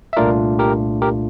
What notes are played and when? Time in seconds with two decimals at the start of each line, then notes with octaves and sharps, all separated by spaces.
0.13 E5
0.17 C2 A#2 A3 D4 F4 A#4 D5
0.59 G4 A#4
1.02 G4 A#4